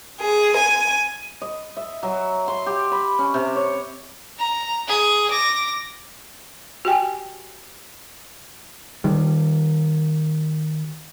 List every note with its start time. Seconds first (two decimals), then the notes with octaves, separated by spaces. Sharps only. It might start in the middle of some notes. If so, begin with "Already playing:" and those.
0.21 G#4
0.57 G#5
1.42 D#5
1.77 E5
2.03 F#3
2.48 C6
2.66 G4
2.92 B5
3.19 C#4
3.34 C3
3.56 C#5
4.39 A#5
4.88 G#4
5.30 D6 A#6
6.85 F#4 G4 G5 G#5
9.04 D#3 G3